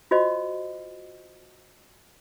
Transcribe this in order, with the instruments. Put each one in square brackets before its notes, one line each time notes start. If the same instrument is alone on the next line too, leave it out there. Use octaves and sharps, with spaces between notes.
[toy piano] F4 F#4 C5 D#5